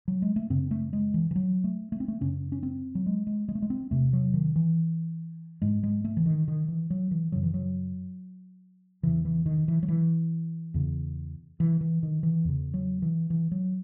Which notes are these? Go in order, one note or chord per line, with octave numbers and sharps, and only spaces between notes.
F#3
G#3
A3
F#2 C#3 C4
A3
G#3
E3
E3
F#3
A3
A3
C4
A3
F#2 C#3 C#4
C#4
C4
F#3
G#3
G#3
G#3
A3
G#3
C4
E2 C3 A3
F#3
D#3
E3
G#2 G#3
G#3
A3
E3
D#3
D#3
E3
F#3
E3
F#2 C#3 F#3
E3
F#3
E2 C#3 E3
E3
D#3
E3
F#3
E3
E2 C#3
E3
E3
D#3
E3
E2 C#3
F#3
E3
E3
F#3